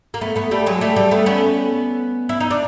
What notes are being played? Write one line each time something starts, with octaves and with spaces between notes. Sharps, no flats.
A#3
A3 B3
A3 B3
G3 A3
F#3 G#3
G3 A3
G3 A3
A3 B3
B3 C#4
E4
D#4
D4